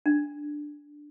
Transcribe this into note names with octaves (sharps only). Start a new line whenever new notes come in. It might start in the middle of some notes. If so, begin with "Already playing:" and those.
D4